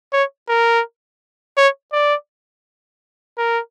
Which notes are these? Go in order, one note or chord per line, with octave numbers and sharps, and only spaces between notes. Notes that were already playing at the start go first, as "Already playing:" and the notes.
C#5
A#4
C#5
D5
A#4